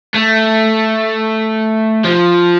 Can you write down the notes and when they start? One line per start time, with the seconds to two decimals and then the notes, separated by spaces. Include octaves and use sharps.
0.14 A3
2.04 F3